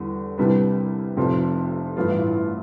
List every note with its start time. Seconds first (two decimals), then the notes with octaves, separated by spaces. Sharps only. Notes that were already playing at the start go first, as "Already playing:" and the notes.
Already playing: E2 D3 G3
0.38 C2 C3 G3 B3 D4
1.16 F1 F2 C3 F3
1.97 A1 G2 E3 B3 F4